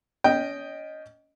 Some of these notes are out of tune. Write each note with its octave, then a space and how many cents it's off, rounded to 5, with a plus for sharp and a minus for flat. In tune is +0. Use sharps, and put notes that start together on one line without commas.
C#4 +35 D#5 +0 G5 +0